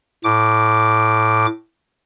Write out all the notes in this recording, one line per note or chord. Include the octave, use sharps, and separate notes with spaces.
A2 D6